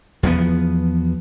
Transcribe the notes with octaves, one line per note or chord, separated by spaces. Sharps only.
E2 F3 B3